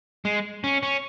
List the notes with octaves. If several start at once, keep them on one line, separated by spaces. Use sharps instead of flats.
G#3
C#4
C#4